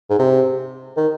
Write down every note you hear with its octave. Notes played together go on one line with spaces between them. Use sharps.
G#2
C3
D#3